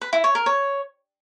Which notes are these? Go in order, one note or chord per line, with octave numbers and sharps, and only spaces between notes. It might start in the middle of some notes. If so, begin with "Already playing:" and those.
B4
E4
C#5
A#4
C#5